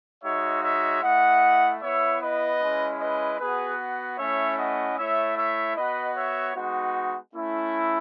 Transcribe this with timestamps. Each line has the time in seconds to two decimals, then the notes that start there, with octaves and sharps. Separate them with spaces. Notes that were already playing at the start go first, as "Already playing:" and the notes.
0.24 G#3 D#4 F#4 C#5 E5
0.64 C#5 E5
1.03 A3 E4 D#5 F#5
1.82 B3 E4 C#5 E5
2.21 B4 D#5
2.61 G#3 C#4 E4
3.00 B4 D#5
3.40 B3 F#4 G#4 B4
4.19 A3 C#4 E4 C#5 E5
4.58 D#5 F#5
4.98 A3 E4 C#5 E5
5.38 C#5 E5
5.76 B3 F#4 B4 D#5
6.16 C#5 E5
6.56 G#3 B3 D#4 F#4
7.35 A3 C#4 E4